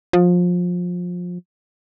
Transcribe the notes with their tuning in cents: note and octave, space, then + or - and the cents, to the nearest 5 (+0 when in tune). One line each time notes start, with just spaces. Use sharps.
F3 +25